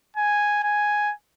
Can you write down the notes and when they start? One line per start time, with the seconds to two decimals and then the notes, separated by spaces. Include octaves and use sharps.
0.17 G#5
0.63 G#5